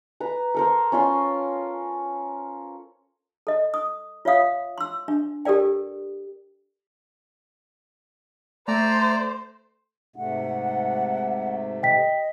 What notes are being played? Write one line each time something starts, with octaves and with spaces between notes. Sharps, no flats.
B4 A#5
A4 A#4 C5
C#4 F4 C6
A4 D#5
D#6
F4 C#5 E5 F5 D#6
C6 E6
D4
G4 A4 A#4 D5 G5
A3 C5 D5 A#5
G#2 C3 A3 F#5
D#5 G5 B6